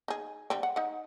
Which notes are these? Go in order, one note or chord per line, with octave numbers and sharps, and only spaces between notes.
D#4 G#4
D3 G3 C4
F#5
D#4 F#5